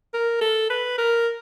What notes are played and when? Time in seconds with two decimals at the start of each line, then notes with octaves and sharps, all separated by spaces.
0.14 A#4
0.41 A4
0.70 B4
0.98 A#4